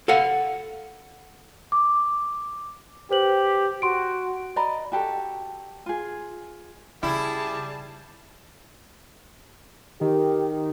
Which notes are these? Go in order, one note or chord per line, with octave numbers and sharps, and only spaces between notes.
A4 F5 F#5
D6
G4 B4 C5 F#7
F#4 C6 D7
D5 D#5 A#5 B5
F#4 G4 A4
F4 G#4
C#3 G3 E4 G#4 A5
D#3 G4